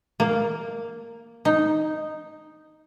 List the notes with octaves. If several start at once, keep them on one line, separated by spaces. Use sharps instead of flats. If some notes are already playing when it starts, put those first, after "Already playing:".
A#3
D#4